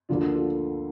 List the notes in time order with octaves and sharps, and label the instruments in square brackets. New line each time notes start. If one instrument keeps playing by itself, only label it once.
[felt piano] D2 D3 F3 A#3 [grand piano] D4 F4
[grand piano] F4 A4